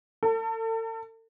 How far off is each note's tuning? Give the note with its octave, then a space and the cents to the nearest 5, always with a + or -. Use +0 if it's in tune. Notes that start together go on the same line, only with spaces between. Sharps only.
A4 +40